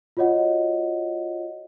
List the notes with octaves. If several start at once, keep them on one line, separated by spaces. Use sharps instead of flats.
F4 F#4 C#5 D#5 F#5